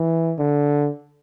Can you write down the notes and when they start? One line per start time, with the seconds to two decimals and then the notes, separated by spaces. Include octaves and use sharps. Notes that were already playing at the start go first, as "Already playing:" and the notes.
Already playing: E3
0.39 D3